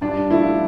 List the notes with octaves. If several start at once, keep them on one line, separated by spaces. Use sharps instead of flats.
G2 D4
F3 A3 E4